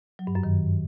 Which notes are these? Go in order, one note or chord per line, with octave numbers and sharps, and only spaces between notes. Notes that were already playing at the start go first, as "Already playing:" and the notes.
F#3
G2
F#2
D#3